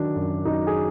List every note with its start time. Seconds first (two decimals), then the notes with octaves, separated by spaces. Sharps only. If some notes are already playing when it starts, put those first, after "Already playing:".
Already playing: D#3 F#3 D4
0.15 F#2
0.45 F#2 D#4
0.67 G#4